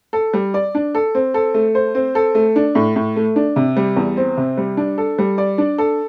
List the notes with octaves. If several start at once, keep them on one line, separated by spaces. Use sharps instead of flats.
A4
G3
D5
D4
A4
C4
A4
A3
C5
C4
A4
A3
D4
A2
A2
A3
D4
C3
G3
E2
C4
C3
G3
D4
A4
G3
D5
D4
A4